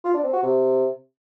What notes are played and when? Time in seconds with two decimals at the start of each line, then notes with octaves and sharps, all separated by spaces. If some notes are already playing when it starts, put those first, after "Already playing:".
0.05 F4
0.14 D4
0.24 C4
0.33 F#4
0.43 C3